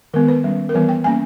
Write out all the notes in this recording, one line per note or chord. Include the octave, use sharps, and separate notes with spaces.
D#3 G#3 B3 A#4
B4
G3 C#4
A#4
E3 G3 B3 B4
G5
G3 A#3 C#4 G#5